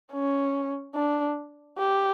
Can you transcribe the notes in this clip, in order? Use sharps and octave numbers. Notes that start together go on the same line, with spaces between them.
C#4
D4
G4